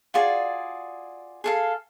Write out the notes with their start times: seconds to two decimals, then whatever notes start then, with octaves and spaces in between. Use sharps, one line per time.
0.14 F4 F#4 G#4 D5
1.44 G#4 A4 F5